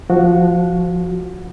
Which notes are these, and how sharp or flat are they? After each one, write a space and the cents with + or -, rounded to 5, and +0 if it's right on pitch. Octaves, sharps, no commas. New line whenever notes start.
F3 +0 F#4 +0 F#5 -35